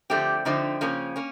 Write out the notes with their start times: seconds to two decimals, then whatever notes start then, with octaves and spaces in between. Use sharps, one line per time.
0.10 D3 F3 A3 C4 G4
0.45 D3 F3 A3 C4 D#4
0.81 C#3 F3 A#3 C#4
1.16 A#3 C#4